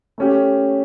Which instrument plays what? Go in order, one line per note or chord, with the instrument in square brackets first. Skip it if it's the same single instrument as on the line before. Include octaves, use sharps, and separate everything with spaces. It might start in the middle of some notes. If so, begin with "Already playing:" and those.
[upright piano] A3 C#4 G4